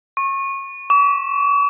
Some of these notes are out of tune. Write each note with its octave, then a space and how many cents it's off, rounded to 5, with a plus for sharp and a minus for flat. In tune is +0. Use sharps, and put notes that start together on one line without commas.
C#6 -25
C#6 +45